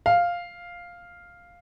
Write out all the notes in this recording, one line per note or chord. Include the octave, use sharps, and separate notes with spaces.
F5